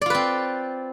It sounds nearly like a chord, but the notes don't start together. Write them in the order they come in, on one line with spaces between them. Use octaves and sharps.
D5 F4 B4 C4